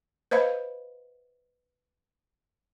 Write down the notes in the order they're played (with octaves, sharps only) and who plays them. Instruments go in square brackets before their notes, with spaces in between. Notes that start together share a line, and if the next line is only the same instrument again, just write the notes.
[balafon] B4 C5 D#5 F5 B5